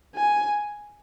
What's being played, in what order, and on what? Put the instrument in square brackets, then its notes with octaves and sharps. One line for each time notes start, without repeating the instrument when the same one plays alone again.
[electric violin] G#5